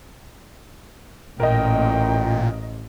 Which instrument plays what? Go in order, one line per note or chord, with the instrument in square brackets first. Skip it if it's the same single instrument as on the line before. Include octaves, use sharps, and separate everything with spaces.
[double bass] A1 [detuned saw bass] A#2 [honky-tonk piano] A#4 D#5 [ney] G5